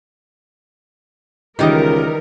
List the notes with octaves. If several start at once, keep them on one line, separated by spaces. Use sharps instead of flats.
C#2 D#3 E3 G3 D#4 G4 A#4 D#5